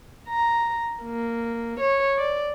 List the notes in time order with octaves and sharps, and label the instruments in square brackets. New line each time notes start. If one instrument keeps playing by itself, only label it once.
[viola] A#5
A#3
C#5
D5